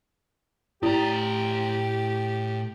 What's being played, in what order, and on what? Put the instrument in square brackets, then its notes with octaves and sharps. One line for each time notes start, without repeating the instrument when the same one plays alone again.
[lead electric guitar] A2 A#5 [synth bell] E4 [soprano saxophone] G4